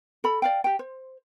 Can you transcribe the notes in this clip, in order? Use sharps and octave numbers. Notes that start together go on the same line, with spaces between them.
A4 B5
D5 F5 G5
G4 G5
C5